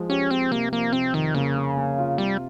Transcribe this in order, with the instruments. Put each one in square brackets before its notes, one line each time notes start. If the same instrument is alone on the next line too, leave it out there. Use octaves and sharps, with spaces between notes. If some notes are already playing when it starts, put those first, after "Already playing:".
Already playing: [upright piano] F3 G#3
[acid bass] C#4 [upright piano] G4
[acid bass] C4 [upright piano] G4
[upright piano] C3 [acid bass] A#3
[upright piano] F3 [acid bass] A#3
[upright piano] C3 [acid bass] C4
[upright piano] F2 [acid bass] D#3
[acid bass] C#3 [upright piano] A#3
[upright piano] A#3
A#3
F4
[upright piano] C3 [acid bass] G3